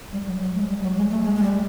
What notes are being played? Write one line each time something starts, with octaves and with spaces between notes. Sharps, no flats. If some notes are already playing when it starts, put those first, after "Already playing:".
G3
F#3
F#3
G#3
G3
F#3
G#3
A3
G#3
G#3
G3